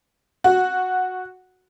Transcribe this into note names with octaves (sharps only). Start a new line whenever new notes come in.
F#4